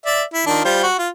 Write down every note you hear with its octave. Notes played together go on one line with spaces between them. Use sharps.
D5 E5
E4
D#3 D4 F4
G3 F4 C5
F#4
F4